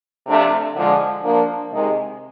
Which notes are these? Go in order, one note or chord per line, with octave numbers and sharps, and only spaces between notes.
C3 F3 A3 D4
D3 F3 G#3
F3 A#3 D4
C3 D#3 G#3